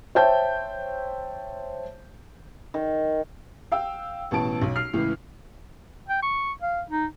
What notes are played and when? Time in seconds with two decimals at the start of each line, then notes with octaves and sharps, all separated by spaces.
0.15 C5 C#5 E5 G5 A5 G6
2.74 D#3
3.72 F5 G5 E6
4.31 A1 B2 E3 A5 D7
4.61 B1
4.76 F6 C7
4.94 C#2 A2 E3
6.08 G5
6.22 C#6
6.61 F5
6.90 D#4